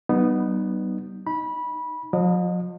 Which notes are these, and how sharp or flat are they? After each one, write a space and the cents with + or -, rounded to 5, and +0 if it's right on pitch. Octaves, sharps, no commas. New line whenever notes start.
G3 -40 B3 +0 D#4 -25
D#4 +0 B5 -20
F3 +45 D#5 -25